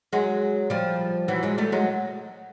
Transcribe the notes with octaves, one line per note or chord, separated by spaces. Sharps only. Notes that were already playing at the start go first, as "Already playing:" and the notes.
F#3 G#3
F3 G3
E3 F#3
F#3 G#3
G3 A3
F#3 G#3